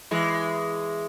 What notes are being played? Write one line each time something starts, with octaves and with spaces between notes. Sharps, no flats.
E3 G#3